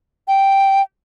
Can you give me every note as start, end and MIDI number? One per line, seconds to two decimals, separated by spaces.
0.28 0.81 79